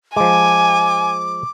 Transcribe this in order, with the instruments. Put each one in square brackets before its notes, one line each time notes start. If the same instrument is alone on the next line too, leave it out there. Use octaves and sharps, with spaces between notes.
[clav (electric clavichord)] F3 G#3 [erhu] G#5 [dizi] D6